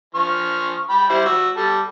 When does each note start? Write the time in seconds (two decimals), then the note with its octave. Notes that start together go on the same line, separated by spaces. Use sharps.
0.15 F3 C#6 F6
0.90 G5 B5
1.10 G3 E4 C5
1.26 F#4 E6
1.57 G3 A4